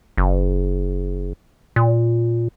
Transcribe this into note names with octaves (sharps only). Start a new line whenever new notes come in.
F#1
A#2